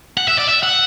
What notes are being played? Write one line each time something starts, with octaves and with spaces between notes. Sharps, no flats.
F#5
E5
D5
E5
F#5